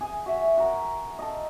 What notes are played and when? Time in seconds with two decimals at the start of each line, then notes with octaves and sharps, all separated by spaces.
0.01 G#4 G#5
0.26 F#4 E5
0.57 F#4 A#4
1.19 A4 D#5